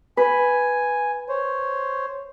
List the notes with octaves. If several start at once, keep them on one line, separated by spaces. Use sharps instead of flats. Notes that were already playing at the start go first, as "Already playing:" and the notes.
B4 G#5
C5 C#5